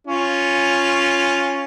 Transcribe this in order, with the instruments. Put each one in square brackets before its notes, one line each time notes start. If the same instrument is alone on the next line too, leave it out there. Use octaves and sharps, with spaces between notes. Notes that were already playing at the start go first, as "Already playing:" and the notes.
[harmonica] C#4 F4